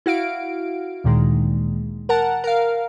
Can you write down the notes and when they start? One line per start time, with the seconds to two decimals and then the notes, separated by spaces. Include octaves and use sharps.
0.06 E4 F#4 F5 D7
1.04 D2 A#2 D#3 G#3
2.09 A#4 F#5 A5
2.44 A#4 F5